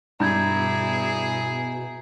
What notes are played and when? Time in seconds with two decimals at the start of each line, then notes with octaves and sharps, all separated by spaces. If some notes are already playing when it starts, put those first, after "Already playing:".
0.20 G2 B2 E4 G#4 A#5 G6 G#6